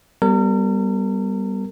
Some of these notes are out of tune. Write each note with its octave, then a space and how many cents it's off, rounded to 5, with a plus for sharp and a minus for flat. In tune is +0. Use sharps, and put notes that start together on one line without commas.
G3 +0 B3 +0 A#4 -40